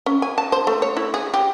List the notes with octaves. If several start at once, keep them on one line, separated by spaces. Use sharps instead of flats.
C#4
G#5
A5
C5
A3
C#5
E4
G#4
G4